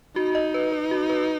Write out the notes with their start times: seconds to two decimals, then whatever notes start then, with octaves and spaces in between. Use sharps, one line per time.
0.16 D#4 F#4
0.35 D#5
0.54 B4
0.72 B4
0.91 F#4
1.09 B4